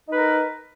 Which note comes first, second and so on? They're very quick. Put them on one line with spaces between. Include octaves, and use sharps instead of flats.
D#4 B4 A#4